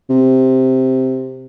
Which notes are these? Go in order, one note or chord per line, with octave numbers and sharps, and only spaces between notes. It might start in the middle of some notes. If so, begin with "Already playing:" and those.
C3